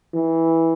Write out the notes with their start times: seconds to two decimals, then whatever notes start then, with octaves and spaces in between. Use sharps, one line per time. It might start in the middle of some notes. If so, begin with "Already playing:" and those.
0.14 E3